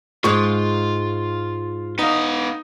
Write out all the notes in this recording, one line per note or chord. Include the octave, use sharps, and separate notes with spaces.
G#2 G#3 F4 C#6
B3 D#4 F5